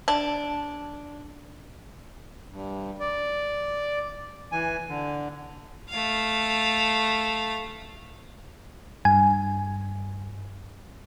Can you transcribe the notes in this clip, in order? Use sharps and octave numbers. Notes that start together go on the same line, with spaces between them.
D4
G2
D5
E3 G#5
D3
A3 F5
G2 G#5